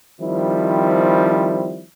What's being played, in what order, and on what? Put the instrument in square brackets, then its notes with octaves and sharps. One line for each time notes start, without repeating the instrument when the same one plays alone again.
[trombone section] D#3 F3 G3 C4 E4